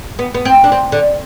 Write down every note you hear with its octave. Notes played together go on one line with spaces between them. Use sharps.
B3
B3
C4
D4
C4
D3